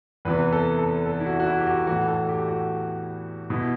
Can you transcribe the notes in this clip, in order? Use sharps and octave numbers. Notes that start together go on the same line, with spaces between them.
E2 C3 E3 B4
A4
A4
A4
E4
F#4
F#4
E4
G4
F#4
A2 E3 F#4
A4
G4
F#4
B2 E4